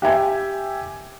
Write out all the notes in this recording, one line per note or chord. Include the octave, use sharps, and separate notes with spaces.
G4 E5 G#5